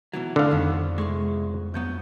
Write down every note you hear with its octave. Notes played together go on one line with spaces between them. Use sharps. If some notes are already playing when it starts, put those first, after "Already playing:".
B2 E3 F#3
A2 D3 F5
F2 D#3 G3 B3
C2 F#2 G#3 C#6
G2 F#3 B3 G6